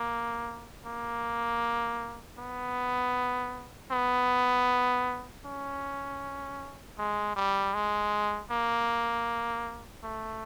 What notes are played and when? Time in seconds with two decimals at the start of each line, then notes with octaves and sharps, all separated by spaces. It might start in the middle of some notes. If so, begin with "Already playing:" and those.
Already playing: A#3
0.85 A#3
2.38 B3
3.91 B3
5.45 C#4
6.98 G#3
7.36 G3
7.74 G#3
8.50 A#3
10.04 A3